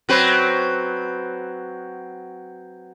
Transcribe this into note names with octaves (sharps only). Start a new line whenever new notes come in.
F#3 C4 B4